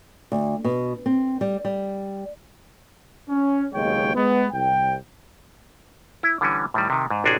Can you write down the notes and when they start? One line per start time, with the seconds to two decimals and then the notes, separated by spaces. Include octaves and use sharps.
0.32 D2
0.64 B2
1.06 C4
1.41 G3
1.65 G3
3.29 C#4
3.73 F#1 D#2 B2 G#3 C#5 G5
4.15 G#3 B3
4.51 C2 G5
6.23 E4
6.41 D3 E3 G3 C#4
6.74 A2 D#3 G3
6.90 C3 D#3
7.10 G#2
7.24 A1 C3 D4 F#4 G#4